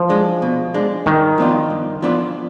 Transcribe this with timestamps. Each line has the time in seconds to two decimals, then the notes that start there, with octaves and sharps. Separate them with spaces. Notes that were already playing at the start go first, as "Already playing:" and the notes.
Already playing: F3
0.09 G#3 D4
0.42 B2
0.74 G#3 D4
1.06 G2 D#3
1.38 F3 B3 D4 F4
1.70 G2
2.02 F3 B3 D4 F4